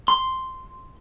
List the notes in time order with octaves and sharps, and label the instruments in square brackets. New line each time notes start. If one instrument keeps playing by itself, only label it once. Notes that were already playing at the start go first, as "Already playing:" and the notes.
[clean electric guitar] C6